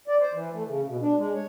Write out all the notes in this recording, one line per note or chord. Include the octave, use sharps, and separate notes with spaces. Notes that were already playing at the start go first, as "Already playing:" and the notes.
D5
C5
E3
A3
C#3
B2
D4
G#3
C#5